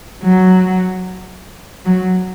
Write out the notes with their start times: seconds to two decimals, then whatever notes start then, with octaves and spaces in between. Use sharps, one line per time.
0.23 F#3
1.85 F#3